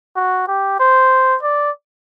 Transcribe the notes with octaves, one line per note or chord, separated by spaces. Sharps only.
F#4
G4
C5
D5